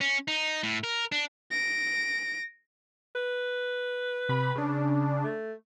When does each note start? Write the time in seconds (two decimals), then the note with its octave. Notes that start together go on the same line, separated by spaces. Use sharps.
0.01 C#4
0.28 D#4
0.63 A2
0.84 A#4
1.12 D4
1.51 A#6 D7
3.15 B4
4.29 C3 B5
4.55 C#3 D4
5.24 A3